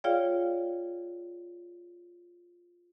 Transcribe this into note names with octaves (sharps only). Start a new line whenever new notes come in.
F4 G#4 C#5 D5 F5 G5